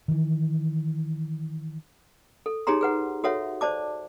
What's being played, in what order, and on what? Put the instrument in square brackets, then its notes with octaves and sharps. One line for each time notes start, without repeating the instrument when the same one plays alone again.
[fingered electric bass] D#3 E3
[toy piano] A4
D#4 G4 G#4 C#5 A#5 C6
G#4 B4 F#5
F#4 A4 C#5 E5 F#5
C5 D5 A5 D6